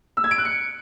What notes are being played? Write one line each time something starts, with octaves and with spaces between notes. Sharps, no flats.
E6
G#6
D7
F#6
C#7